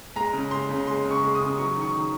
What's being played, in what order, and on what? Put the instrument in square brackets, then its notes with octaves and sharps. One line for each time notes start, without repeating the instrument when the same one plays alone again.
[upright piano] G#3 A#5
C#3
G#3 C6
C#3
G#3 C6
C#3
C#6
G#3
D#6
C#3
F#3 C#6
D#3
C#6
D#3